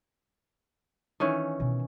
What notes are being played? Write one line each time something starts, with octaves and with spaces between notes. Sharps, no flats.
D#3 E3 C#4
B2 C4